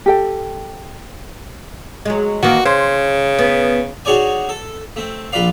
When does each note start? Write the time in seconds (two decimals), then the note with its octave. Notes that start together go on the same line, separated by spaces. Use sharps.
0.06 G4 A4 G5
2.05 F#3 G#3
2.43 D#3 E3 A#3 F#4
2.66 C#3 C5
3.39 B3
4.05 D#4 F#4 G#4 C#5 D5 G#5
4.49 A4
4.96 A3 C4
5.32 A#1 F4 B4 D5 F5